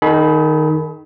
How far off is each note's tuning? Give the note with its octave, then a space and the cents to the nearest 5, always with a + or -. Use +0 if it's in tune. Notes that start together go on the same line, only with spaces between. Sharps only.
D#3 -5 G#4 +45 B5 +0